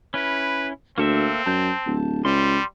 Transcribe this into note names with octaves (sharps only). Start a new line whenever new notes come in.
C#4 E4 B4
D2 A#3 C4 A4 E5
F#2 A5 G6
D1
C#2 G3 C6